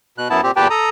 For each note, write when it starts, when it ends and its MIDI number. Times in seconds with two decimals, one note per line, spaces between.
0.18 0.28 47
0.18 0.28 90
0.30 0.41 42
0.30 0.41 59
0.30 0.41 64
0.30 0.41 81
0.43 0.51 46
0.43 0.51 60
0.43 0.51 67
0.56 0.68 40
0.56 0.68 46
0.56 0.68 67
0.56 0.68 71
0.56 0.68 79
0.56 0.68 81
0.70 0.90 69
0.70 0.90 82
0.70 0.90 87